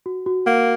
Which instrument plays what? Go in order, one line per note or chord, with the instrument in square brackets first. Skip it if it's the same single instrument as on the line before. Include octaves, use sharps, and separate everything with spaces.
[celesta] F#4
F#4
[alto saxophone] A#3 [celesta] F#5